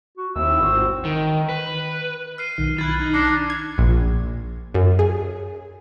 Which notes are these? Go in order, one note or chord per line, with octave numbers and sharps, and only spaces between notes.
F#4
D#2 C4 E4 E6
G#1 C4 F#4 C5
D#3
B4
F6 C7 D#7
B1 D#3
E4 B5 F#6 G#6 A6
D#4
D4 A#6 C7 C#7
G#6
A#1
F#2
G#4